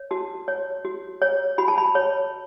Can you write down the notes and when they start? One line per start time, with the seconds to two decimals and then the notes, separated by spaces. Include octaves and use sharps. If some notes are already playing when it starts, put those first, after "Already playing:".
Already playing: C#5
0.11 F#4 A5
0.48 C#5
0.85 F#4
1.22 C#5
1.58 F#4 B5
1.68 A5
1.78 B5
1.95 C#5